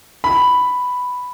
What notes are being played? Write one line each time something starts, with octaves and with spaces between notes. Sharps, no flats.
B5